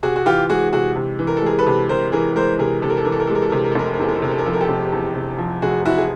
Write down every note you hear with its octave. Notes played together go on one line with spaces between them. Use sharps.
C3 F#4 G#4
F#4
E3 F4 G4
G#3 F#4 G#4
C3 F#4 G#4
C3
E3
A#4
A4
G#3 G#4 A#4
A4 B4
C3
C3 A#4 C5
E3 G#4 A#4
G#3 A#4 C5
C3 G#4 A#4
C3 A4
A#4
A4
E3 A#4
A4
A#4
A4
G#3
A#4
A4
A#4
C3 A4
A#4
A4
F1 A#4
A4
A#4
E2 A4
A#4
A4
C3 A#4
A4
A#4
F3 A4
A#4
G4 A4
F1
E2
C3
F3
F1 F#4 G#4
E2 E4 F#4
G#4